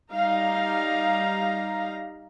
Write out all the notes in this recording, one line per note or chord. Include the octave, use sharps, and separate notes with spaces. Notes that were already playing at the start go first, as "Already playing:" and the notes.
G3 D#4 F5 A#5